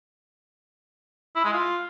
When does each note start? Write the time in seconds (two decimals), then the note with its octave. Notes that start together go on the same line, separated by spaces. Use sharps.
1.36 E4
1.44 G#3
1.53 F4